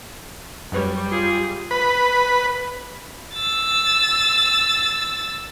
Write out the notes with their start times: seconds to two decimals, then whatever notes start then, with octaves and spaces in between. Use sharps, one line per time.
0.72 F#2 G3 B4 C#5
1.12 F4 G#4
1.71 B4
3.36 E6 A6